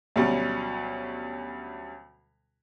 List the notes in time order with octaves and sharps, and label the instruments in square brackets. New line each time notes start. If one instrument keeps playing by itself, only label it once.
[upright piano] D2 B2 F#3 G3 C#4